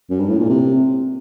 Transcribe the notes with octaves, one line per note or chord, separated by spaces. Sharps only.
F#2
G2
A2
A#2
C3